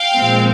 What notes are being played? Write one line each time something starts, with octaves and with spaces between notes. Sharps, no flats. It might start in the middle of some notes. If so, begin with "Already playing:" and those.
Already playing: F5 G5
A#2 F3 G#3 C4